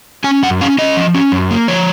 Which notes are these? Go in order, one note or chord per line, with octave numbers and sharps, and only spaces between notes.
C#4 G#5
F#2 F#5
C#4 F5
C#4 D#5
F3
C#4
F#2
A#3
F3 C#5